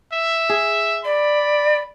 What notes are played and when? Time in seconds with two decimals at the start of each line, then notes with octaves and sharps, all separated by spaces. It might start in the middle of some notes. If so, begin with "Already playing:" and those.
0.13 E5
0.50 G#4
1.05 D5 B5